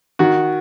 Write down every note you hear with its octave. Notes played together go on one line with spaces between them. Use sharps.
D#3 F#4